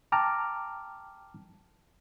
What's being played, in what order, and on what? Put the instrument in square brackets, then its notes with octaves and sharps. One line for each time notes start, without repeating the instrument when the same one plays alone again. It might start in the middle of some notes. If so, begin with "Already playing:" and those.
[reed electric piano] G5 A5 A#5 D6 F6